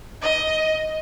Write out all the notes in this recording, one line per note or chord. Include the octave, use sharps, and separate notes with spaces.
D#5